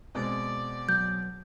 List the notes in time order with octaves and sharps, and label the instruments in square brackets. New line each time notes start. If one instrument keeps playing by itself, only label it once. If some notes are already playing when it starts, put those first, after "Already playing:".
[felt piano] B2 G#3 C4 [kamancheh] D5
[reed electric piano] F#3 [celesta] G6